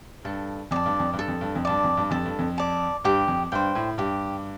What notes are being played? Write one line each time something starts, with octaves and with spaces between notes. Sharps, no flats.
G2 A4
F2 D5 A5
G2
F2
G2
A4
F2
G2
F2
G2 D5 A5
F2
G2
F2 A4
G2
F2
D5 A5
G2 G4
F2
G2 C5 G5
A2
G2 G4